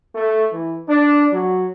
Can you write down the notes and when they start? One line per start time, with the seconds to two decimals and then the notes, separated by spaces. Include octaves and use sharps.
0.14 A3
0.52 E3
0.88 D4
1.33 F#3